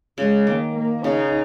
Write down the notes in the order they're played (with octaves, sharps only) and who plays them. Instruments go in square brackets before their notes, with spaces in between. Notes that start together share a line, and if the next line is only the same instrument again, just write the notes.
[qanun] C#3 [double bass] G#3
[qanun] D#3 [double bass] A#3
[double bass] A#3
[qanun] C#3 [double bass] D#4